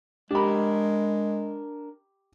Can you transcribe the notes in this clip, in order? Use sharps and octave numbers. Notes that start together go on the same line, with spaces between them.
G#3 D4 G4 A#4 B5